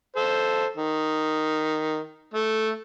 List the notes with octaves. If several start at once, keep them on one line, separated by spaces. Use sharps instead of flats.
A4 C5
D#3
A3